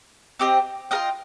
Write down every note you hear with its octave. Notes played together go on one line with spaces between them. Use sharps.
C4 G4 C5 D#5
F4 A#4 D#5 G5